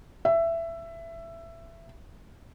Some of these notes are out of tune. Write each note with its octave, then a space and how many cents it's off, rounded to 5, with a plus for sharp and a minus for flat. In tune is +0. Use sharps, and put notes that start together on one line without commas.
E5 +15